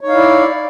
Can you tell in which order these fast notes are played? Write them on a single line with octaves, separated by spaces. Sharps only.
C#5 D#4 F5 E4 D5